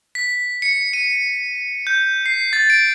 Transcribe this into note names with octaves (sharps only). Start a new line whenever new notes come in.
B6
C#7
D#7
G6
C7
A6
D7